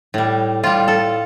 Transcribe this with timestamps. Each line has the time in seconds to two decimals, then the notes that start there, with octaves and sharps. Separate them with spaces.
0.14 A2 G3
0.63 A2 G3 F4
0.88 A4